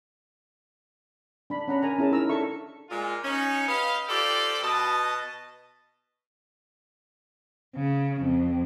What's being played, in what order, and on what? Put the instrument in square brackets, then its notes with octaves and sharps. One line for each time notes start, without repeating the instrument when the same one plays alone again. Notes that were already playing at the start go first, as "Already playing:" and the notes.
[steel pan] D4 B5
C#4 F#5 A#5 B5
A#4 G#5 A#5
C#4 E4 G#4 A5
D#4 A#4 A#5 E6
D4 A4 E5 C#6
[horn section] A#2 G#3 F4
C#4 D#4
G4 B4 D#5 F5
F4 G4 A4 C5 D5 G5
B2 D#5 A5
[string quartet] C#3
F2